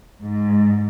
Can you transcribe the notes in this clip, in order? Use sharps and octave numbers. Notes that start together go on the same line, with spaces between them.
G#2